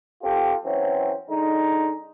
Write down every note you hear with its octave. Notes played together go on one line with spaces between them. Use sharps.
C4 F4 G4 A4
E3 F#3 C4 C#4
D3 G#3 D#4